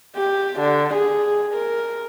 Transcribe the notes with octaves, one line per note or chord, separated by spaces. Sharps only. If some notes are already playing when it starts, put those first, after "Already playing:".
G4
D3
G#4
A#4